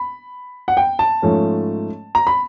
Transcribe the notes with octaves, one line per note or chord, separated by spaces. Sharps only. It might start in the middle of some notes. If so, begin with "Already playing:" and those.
Already playing: B5
F#5
G5
A5
G#2 F3 A3 C#4
A#5
B5